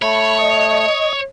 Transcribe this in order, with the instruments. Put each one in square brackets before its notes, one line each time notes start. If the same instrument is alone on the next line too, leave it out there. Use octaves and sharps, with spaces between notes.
[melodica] A3 [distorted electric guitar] C#5 [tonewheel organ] B5
[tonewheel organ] D#5